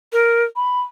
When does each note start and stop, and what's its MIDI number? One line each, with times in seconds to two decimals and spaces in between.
0.13 0.44 70
0.56 0.81 83